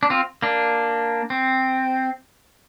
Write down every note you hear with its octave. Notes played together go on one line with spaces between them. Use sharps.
D4
C4 F4
A#3 D4
C4